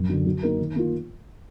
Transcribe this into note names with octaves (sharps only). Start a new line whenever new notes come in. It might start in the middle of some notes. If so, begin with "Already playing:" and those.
Already playing: F#2
D3 F#3
F#3
A#3 D#4 A#4
D#3
A#3 F4